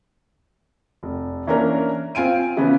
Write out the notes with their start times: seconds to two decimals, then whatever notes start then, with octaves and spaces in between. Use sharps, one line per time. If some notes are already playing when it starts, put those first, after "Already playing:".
1.03 F1
1.47 E3 A#3 C#4 D4 A#4
2.15 C4 F4 G#5 D7 D#7
2.57 C#3 E3 F3 B3 C#4